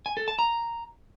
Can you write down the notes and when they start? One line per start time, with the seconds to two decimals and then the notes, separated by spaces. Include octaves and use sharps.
0.06 G#5
0.17 A4
0.28 A5
0.39 A#5